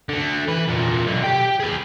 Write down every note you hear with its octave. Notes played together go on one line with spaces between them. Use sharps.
D3 A3
E3 B4
E2 A#2
B1 D3
G4 G5
G#4 B4